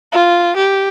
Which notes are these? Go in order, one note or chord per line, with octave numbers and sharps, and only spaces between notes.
F4
G4